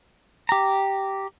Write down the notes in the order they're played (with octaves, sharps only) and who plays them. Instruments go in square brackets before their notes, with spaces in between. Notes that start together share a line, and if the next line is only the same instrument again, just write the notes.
[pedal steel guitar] G4 A#5